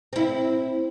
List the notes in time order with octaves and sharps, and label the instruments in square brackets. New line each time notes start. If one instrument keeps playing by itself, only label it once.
[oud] C4 E4